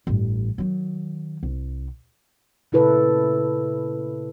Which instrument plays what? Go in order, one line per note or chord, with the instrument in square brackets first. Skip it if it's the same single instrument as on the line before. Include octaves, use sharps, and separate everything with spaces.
[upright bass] A1 G2
D#3 F#3
C2
[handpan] A#2 C#3 E4 A4 B4